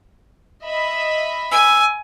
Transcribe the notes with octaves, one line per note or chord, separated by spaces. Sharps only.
D#5 E5 B5
G#5 E6